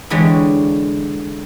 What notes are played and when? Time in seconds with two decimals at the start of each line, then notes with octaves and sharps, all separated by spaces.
0.10 D3 E3 G#3 D4 G4 C#5